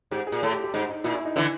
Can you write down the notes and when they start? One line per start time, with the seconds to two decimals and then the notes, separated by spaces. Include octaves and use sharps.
0.11 G#2 G4
0.27 G#4
0.32 A#2
0.42 A2 A4
0.53 G4
0.64 G4
0.74 G#2 D#4
0.90 D#4
1.04 A#2 E4
1.15 E4
1.25 D#4
1.36 D3 E3 E4